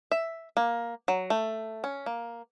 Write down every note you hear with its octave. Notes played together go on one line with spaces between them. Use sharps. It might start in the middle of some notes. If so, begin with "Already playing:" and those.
E5
A#3
F#3
A3
C#4
A#3